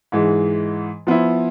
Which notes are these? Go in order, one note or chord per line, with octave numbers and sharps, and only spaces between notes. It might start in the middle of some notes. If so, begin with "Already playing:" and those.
G#2 E3 G#3
F3 B3 E4